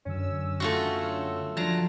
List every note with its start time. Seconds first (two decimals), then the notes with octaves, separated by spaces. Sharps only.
0.06 F#2 D3 C#4 E6
0.60 A3 F4 F#4
1.57 F3 F#3 D4 A5 A#5